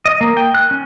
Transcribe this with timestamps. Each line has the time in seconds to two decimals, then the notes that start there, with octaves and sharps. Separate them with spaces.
0.06 D#5
0.21 A#3
0.37 G5
0.54 F#6
0.71 C#4